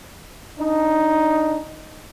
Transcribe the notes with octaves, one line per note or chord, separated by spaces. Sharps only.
D4 D#4